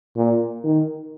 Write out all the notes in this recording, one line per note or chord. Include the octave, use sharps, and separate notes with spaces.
A#2
D#3